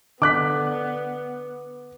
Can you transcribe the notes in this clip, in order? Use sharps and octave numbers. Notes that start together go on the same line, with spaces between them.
D3 B3 D6 F#6 B6